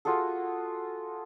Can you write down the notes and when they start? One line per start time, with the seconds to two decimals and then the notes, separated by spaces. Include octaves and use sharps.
0.05 F4 F#4 G#4 A4